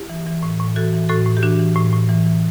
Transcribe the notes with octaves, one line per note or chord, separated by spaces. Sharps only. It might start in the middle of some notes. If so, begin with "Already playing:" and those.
Already playing: E4 G4
E3
E3
A2
A2
E3 F#4 A4
E3
A2 F#4 A4
A2
G4
E3 D4 F#4
E3
A2
A2
E3
E3